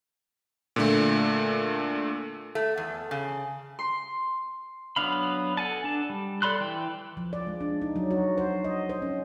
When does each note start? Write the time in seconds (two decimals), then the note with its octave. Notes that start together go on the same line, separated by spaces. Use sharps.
0.76 A#2 D3 A3
2.55 A3
2.77 E2
3.11 C#3
3.79 C6
4.96 F#3 B3 D4 F5 B5
5.57 A4 F#5 G#5 A5
5.84 D4 A5
6.10 G3
6.42 A4 D5 B5 C6 F#6
6.60 E3 G5
7.17 F3
7.33 D5
7.47 G#3
7.61 D4
7.82 D#4
7.96 F#3
8.11 F#4
8.38 C5
8.64 D#5
8.89 C5
9.02 C#4